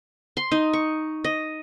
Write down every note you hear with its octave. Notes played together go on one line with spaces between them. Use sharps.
C6
D#4
C#6
D#5